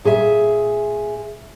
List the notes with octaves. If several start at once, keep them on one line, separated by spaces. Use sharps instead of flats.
A#2 G#4 B4 E5